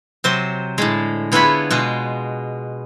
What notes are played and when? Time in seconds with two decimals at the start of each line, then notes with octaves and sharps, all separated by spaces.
0.24 C3 F#3 C5 C6
0.78 A2 D3 G#3
1.32 D3 B3 E4 F4 C#5 B5
1.70 B2 G#3 F4